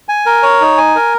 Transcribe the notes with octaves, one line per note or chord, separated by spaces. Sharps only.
G#5
A#4
C#5
D#4
G#5
A#4